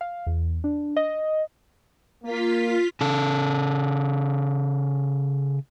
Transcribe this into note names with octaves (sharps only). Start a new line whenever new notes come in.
F5
E2
D4
D#5
A#3 F4 B6
C#3 A4